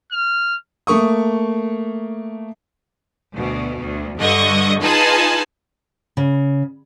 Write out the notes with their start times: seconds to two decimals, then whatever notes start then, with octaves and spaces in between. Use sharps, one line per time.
0.11 F6
0.87 A3 A#3 C#6 D#6
3.34 D2 B2
3.81 D2
4.20 G2 D3 D#5 C#6 D#6
4.83 D#4 F4 G#4 B4 G#5 A5
6.17 C#3